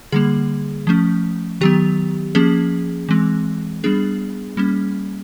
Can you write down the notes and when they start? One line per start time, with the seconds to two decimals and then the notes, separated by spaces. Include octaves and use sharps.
0.12 D3 G3 A#3 G#4
0.87 F3 A3 C#4
1.61 D#3 F#3 B3 G4
2.35 F3 A#3 C#4 G#4
3.09 E3 G#3 C4
3.84 G3 B3 D4 G#4
4.57 G3 A#3 C#4